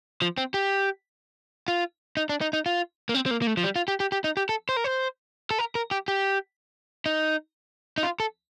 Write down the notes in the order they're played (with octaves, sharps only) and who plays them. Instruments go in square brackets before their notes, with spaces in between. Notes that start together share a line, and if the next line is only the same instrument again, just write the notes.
[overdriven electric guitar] F3
C4
G4
F4
D#4
D4
D#4
D#4
F4
A#3
C4
C4
A#3
A#3
A3
F3
G3
F4
G4
G4
G4
D#4
G4
A4
C5
A#4
C5
A4
A#4
A#4
G4
G4
D#4
D#4
F4
A4